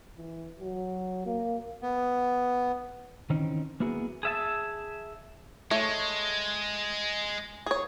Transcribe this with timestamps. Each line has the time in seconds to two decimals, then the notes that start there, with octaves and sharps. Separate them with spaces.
0.18 E3
0.60 F#3
1.26 A#3
1.82 B3
3.30 D#3 E3 C4 C#4 D#4
3.80 A#3 B3 E4 F#4 G#4
4.23 G#4 E5 A5
5.71 G#3 A3 C#5
7.66 G#4 C#5